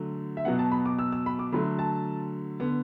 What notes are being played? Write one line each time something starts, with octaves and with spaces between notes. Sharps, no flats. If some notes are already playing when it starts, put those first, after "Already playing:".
Already playing: D3 F#3 A3
E5
B2 F#3 B3 F#5
A5
B5
D6
E6
E6
B5
D6
D3 F#3 A3 B5
A5
D3 B3